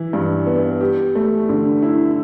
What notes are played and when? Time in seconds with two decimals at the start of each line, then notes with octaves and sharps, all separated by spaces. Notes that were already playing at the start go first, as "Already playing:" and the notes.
Already playing: E3 E4
0.13 G2
0.47 B3
0.81 G4
1.15 A3
1.49 D3
1.83 E4